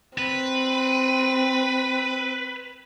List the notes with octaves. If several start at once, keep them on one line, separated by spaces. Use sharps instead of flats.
C4 B4